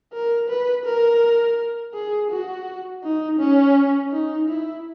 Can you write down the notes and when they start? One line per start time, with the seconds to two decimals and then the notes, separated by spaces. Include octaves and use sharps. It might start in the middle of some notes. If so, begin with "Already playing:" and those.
0.13 A#4
0.49 B4
0.86 A#4
1.94 G#4
2.31 F#4
3.04 D#4
3.40 C#4
4.13 D#4
4.49 E4